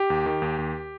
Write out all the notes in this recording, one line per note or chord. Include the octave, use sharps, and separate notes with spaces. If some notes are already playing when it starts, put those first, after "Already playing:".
Already playing: G4
D#2
D#3
D#2
D#2